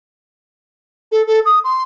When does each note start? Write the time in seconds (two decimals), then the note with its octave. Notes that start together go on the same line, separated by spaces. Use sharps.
1.12 A4
1.27 A4
1.45 D#6
1.64 C6